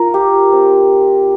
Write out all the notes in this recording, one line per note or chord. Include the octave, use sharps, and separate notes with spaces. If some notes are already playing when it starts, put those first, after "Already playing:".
Already playing: F4 A#4
G4
C4